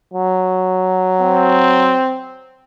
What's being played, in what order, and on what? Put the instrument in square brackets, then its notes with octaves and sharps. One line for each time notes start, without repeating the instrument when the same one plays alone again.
[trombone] F#3
[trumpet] C4